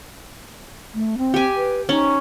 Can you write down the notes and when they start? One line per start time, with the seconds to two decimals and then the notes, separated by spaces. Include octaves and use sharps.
0.94 A3
1.18 C4
1.34 G4 G#5
1.56 B4
1.89 C#4 D#4